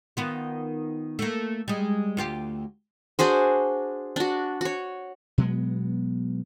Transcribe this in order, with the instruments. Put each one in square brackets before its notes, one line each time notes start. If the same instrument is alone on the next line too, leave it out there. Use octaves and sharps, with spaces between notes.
[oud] D#3 B3 F4
A3 A#3
G3 G#3
D2 F4 G4
[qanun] D4 F#4 G#4 C5
D4 F#4
F#4 C#5
[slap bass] B2 F#3 G#3 B3